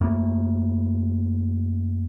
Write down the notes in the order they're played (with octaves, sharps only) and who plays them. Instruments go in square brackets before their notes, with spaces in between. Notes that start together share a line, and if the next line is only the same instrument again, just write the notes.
[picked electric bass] F#2 A3 A#3